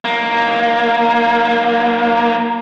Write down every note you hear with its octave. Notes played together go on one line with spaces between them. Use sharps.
B1 A#3